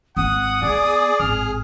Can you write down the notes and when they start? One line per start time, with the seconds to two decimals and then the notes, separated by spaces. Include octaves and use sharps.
0.17 G#1 G#2 F#5 D#6
0.62 B3 G#4 D5
1.20 G#1 A2 F6